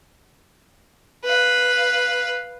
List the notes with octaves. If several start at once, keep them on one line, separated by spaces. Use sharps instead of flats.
B4 F5